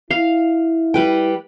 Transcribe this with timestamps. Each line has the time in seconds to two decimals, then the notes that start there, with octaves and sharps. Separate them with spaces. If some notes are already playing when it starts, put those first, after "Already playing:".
0.11 E4 F5
0.94 G3 B4 G5